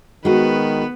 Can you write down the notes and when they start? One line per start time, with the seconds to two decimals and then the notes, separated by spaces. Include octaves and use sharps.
0.25 D#3 G#3 B3 F#4 B4